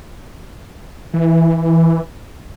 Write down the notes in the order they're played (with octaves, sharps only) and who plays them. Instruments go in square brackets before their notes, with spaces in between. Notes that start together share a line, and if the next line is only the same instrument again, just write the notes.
[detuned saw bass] E3